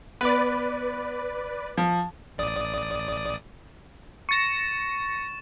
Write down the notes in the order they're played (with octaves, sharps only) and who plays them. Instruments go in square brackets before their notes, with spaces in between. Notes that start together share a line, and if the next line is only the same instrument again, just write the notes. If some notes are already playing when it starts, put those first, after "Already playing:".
[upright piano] B3 [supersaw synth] B4 D5
[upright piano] F3
[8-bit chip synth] A1 D5 D#6
[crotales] C#6 A6 E7 [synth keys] A#6 C#7